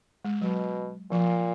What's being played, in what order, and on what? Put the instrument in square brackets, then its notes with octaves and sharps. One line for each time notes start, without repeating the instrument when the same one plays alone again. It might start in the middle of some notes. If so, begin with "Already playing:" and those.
[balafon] G#3
[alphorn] B2 [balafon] F#3
[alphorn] A#2 [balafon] F3